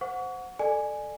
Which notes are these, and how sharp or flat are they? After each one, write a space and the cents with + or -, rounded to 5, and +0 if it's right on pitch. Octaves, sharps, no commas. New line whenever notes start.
C5 -15 F#5 -15 C#6 +35
A4 +0 D5 +30 G#5 +0